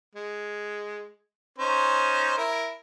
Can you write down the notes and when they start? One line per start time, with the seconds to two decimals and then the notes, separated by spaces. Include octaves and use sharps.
0.15 G#3
1.58 C#4 D#4 C5
2.37 E4 A#4